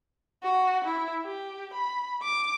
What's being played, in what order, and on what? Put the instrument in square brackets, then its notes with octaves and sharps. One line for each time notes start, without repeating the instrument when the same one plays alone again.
[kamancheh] F#4
E4
G4
B5
D6